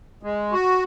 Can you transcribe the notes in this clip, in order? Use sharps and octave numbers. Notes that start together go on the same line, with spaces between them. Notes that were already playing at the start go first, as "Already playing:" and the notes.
G#3
F#4